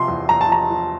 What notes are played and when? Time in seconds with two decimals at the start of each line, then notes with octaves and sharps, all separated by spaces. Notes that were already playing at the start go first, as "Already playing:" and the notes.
Already playing: C3 F3 C6
0.08 E2
0.29 E2 A#5
0.41 A5
0.49 F3 A#5
0.70 F3